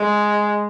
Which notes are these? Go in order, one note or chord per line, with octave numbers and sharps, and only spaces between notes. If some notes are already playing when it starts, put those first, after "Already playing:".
Already playing: G#3